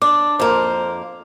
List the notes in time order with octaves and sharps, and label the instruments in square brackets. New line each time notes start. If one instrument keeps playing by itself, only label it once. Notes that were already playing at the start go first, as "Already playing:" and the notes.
[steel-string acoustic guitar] D4 [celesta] D6
[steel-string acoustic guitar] F2 A#3 [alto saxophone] C5